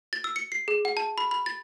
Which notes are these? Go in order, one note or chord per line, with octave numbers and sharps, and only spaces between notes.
A6
E6
C#7
C7
G#4
F#5
A5
B5
B5
A6